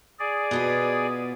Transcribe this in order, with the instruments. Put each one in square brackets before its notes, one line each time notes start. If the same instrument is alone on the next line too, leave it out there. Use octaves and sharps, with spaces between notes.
[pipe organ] G#4 D5
[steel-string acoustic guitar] B2 B3 F4